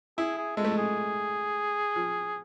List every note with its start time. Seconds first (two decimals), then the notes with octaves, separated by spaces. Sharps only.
0.18 E4 G#4
0.38 G#4
0.57 G#3 A4
0.65 A3
0.72 G#3
0.78 G#4
1.96 F3